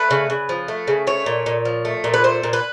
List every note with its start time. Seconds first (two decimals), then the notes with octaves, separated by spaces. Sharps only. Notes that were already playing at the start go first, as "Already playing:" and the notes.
Already playing: A3 B4
0.11 C#3
0.30 C#3
0.49 F3
0.68 A3
0.88 C#3
1.07 A3 C#5
1.26 A#2
1.46 A#2
1.65 F3
1.85 A3
2.04 A#2
2.14 B4
2.24 A3 C5
2.43 A#2
2.53 B4